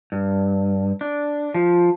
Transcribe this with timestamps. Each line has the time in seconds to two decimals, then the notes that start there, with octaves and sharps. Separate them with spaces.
0.12 G2
1.01 D4
1.54 F3